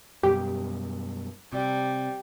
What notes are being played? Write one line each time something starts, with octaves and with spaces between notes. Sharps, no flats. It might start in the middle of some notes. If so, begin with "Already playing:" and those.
F#2 B2 G3 G4
C3 G3